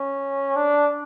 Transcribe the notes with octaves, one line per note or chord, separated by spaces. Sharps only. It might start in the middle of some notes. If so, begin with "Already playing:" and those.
Already playing: C#4
D4